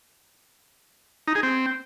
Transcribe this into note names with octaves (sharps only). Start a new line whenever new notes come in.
D#4
G#4
C4